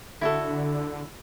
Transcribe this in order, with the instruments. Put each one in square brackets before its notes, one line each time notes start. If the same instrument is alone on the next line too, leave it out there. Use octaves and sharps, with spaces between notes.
[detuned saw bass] D3 [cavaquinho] E4 F#4 A4